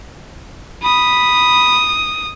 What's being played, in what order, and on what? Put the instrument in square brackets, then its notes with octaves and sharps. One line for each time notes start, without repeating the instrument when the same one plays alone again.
[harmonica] B5 [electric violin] D#6